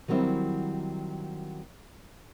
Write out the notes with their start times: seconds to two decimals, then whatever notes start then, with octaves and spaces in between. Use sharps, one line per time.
0.08 D#3 F#3 G3 C4 E4